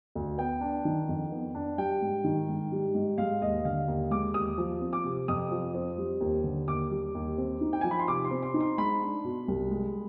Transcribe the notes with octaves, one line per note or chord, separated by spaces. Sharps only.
D2
B3 G5
D4
D#3
F2
B3
D4
G3 G5
G#2
D#3
G#2
G3
G#2
G#3 F5
D#2 D#5
D3 F5
D#2
G#3 D6
D#2 D#6
F3
C4
D6
C3
F2 D#6
F3
C4
G3
D#2
D3
D#2 D6
G3
D#2
C4
D#4
G5
F3 G#5
B5
C6
C3 D6
C6
C4
C6
D#4
C6
G#3 B5
D4
B2
C2
G#3